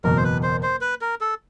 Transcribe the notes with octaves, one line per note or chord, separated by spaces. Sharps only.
F#1 E2 B2 A#4
C5
B4
C5
C5
B4
A#4
A4